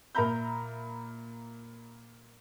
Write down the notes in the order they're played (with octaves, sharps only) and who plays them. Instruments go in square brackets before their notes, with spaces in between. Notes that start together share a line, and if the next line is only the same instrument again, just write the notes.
[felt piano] A#2 A#4 E5 A#5 B5 G6